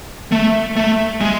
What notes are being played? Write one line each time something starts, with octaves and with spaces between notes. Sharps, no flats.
A3
A3
G#3